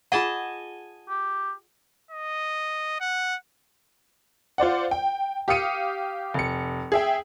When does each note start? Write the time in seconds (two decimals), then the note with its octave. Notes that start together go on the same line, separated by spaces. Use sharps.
0.12 F4 G#4 D#5 F#5 G#5 A5
1.09 G4
2.11 D#5
3.00 F#5
4.58 F4 C5 D5 F#5
4.91 G5
5.48 G4 F5 D#6 C#7 D#7
6.34 F1 C#7
6.92 G#4 E5 G5